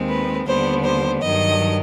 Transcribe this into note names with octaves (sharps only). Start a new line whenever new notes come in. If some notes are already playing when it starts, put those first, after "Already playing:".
Already playing: D#2 D#3 G#3 C4
B4
D#2 D3 G3 B3 C5
C5
G2 D#3 F#3 D#5